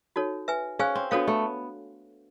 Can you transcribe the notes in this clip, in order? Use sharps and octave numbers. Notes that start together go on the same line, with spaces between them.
D#4 F#4 A4 C#5
B4 E5 G#5
C#4 G#4 C5 F5 G#5
C4
B3 D4 F#4 A4 C#5 F5
A3